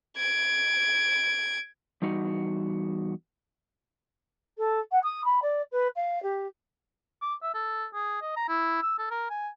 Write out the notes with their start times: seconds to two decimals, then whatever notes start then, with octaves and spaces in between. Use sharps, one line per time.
0.17 G#6 D7
2.02 E2 G3 D#4 F#4
4.57 A4
4.91 F#5
5.03 D#6
5.24 B5
5.42 D5
5.71 B4
5.95 F5
6.22 G4
7.22 D6
7.43 E5
7.54 A4
7.94 G#4
8.21 D#5
8.36 A#5
8.49 E4
8.82 E6
8.99 A4
9.11 A#4
9.30 G#5